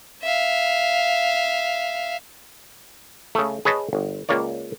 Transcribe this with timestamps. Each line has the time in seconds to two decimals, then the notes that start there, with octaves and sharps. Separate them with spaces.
0.23 E5 F5
3.35 C#3 A3
3.65 G#4 B4 C#5 D#5 A5
3.93 G1
4.29 C#2 A#3 C#5 D5